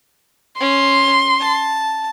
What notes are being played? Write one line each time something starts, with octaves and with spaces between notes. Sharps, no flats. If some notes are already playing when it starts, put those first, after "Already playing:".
C#4 C6
A5